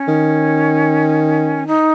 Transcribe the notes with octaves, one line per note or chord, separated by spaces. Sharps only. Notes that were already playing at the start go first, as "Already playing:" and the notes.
Already playing: C#4
D#3
D#4